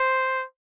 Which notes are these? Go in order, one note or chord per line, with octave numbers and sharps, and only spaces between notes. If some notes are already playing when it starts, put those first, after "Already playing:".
Already playing: C5